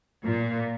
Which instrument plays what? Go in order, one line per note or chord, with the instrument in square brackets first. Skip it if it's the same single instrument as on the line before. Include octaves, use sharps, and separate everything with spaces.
[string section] A#2